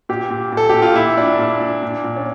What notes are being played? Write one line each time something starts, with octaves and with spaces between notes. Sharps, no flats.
A#2 G4
A#2
A#2
A4
A#2 G4
F4
A#2 E4
A#2 D4
A#2
A#2
A#2
A#2
C#4